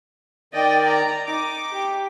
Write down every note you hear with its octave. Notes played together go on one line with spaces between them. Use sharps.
D#3 D5 D#5 G5
A#5
D#4 D6
G4